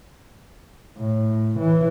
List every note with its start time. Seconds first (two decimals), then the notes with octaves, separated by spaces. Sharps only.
0.98 A2
1.59 E3